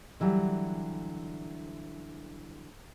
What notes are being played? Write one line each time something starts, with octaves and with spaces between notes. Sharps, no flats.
D3 E3 F#3 G3